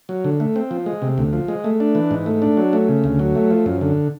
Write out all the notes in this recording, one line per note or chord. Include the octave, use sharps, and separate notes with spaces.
F#3
D3
A3
C4
F3
G#3
C3
D2
F3
G#3
A3
D4
E3
G#2
A3
D4
F#3
A3
C#3
D2
F#3
A3
F3
F#2
D3